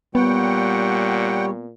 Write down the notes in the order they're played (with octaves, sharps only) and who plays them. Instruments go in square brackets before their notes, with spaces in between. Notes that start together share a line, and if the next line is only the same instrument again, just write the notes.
[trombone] A#2 [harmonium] G3 C#5 [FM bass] B3 [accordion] F#5 G5